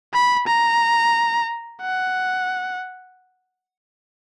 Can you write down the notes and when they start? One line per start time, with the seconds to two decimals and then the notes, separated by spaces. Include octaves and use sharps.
0.13 B5
0.47 A#5
1.82 F#5